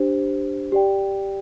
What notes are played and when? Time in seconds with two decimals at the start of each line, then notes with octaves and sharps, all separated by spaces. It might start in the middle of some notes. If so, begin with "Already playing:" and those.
Already playing: D4 G4 C5
0.72 G4 D5 G5